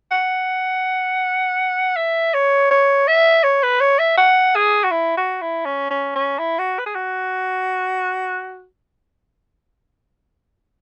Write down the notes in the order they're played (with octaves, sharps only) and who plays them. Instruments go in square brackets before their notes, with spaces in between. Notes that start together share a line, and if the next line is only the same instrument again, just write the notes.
[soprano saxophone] F#5
E5
C#5
C#5
E5
C#5
B4
C#5
E5
F#5
G#4
F#4
E4
F#4
E4
C#4
C#4
C#4
E4
F#4
B4
G#4
F#4